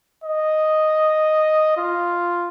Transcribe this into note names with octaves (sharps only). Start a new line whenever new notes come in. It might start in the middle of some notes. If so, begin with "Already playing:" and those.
D#5
F4